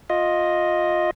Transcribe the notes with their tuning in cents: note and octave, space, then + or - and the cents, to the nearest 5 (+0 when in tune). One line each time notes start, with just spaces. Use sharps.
F4 +15 D#5 +0